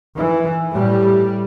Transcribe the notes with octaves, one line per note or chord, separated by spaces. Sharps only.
E3
A2 G3